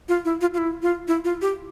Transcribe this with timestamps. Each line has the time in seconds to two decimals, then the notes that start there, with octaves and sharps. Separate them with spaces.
0.09 F4
0.25 E4
0.41 F4
0.54 F4
0.58 E4
0.83 F4
1.08 E4
1.24 F4
1.42 G4